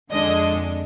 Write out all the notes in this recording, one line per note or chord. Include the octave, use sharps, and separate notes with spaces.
F2 D3 G#3 D4 D#5